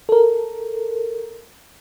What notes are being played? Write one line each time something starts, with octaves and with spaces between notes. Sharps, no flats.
A4 A#4